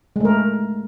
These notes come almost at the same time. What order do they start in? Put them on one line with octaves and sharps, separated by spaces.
G#3 A3 A#4